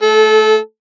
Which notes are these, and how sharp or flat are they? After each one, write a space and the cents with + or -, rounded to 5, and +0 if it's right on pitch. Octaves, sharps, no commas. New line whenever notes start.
A3 +0 A4 -25